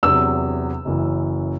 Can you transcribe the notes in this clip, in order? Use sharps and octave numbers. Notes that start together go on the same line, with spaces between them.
E2 C3 F#3 E6
F#1 F#2 E3